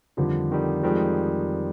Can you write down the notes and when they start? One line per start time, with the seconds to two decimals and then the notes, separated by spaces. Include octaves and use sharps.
0.17 F2 D3 D#3 F3 G3
0.51 F2 D#3 G3
0.82 F2 D#3 F3 G3 G#3